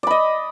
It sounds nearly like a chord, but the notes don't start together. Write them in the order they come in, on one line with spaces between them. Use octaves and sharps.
D5 B5 D#5